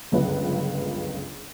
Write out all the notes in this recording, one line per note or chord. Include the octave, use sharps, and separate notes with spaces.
G1 C#2 F#2 F4 B4